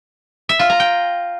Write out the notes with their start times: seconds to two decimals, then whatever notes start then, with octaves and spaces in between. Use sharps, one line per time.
0.49 E5
0.59 F4
0.70 A#5
0.80 G5